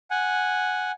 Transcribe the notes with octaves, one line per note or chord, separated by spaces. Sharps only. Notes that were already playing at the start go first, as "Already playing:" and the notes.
F#5 G#5